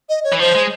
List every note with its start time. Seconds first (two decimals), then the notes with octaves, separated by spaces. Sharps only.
0.09 D#5
0.24 C#5
0.32 E3
0.40 F3 C5
0.55 G#3